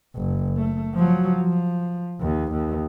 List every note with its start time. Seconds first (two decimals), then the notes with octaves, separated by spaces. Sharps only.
0.16 F#1
0.57 A3
0.95 F3 F#3
1.41 F3
2.21 D#2
2.52 D#2